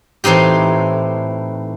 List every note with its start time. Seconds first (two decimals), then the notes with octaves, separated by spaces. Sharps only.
0.24 A2 E3 C4 D#4 G4